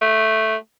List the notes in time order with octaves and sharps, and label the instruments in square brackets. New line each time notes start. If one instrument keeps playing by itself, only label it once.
[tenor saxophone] A3